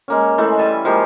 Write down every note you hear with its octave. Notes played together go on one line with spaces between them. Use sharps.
G#3 A#3 C#4
E3 G#3 A3
G3 E5 G#5 A5
F3 G#3 A#3 G4